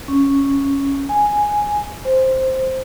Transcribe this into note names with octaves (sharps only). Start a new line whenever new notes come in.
C#4
G#5
C5